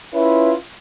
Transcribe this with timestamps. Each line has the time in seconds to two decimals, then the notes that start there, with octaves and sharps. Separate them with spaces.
0.14 C#4 E4 F4 B4